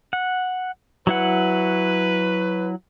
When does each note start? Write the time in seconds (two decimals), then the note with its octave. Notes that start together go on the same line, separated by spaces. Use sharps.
0.13 F#5
1.07 F#3 E4 B4 F#5